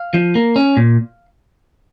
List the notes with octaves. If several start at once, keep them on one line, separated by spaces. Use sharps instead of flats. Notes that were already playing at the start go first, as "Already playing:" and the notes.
Already playing: F5
F3
A#3
C#4
A#2